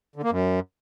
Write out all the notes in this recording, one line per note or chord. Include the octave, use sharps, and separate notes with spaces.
D3
A#3
F#2